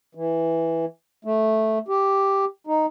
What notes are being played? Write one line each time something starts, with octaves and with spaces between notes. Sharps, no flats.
E3
A3
G4
D#4